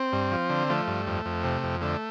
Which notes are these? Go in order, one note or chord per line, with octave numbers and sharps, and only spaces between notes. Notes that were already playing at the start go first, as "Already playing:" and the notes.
Already playing: C4
G2
F3
D3
F3 A3
G2
F2
F2
C3
F2
D3 A3